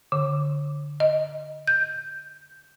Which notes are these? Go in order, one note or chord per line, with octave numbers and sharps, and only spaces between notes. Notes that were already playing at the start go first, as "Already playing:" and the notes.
D3
D#5
G6